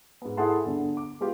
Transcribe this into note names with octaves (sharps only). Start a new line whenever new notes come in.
G#2 B3
E4 G#4 A4 F#5 A5 C6
G1 D3
D6
G#3 B3 F4 G4